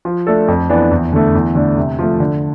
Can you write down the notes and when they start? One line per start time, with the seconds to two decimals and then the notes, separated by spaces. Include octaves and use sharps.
0.05 F3
0.27 A3 D4 A4
0.48 F2
0.70 E3 B3 D4
0.91 E2
1.13 D3 A3
1.35 E2
1.55 D3 A3 D4
1.77 C3
1.99 F3 A3
2.20 D3